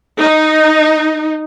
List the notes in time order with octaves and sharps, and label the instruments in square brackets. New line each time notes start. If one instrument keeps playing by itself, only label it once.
[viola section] D#4